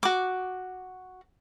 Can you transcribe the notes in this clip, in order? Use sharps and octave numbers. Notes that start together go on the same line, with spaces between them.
F#4 D6